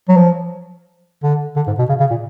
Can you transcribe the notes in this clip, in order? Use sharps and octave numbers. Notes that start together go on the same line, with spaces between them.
F#3
F3
D3
D3
G#2
B2
C#3
C#3
A#2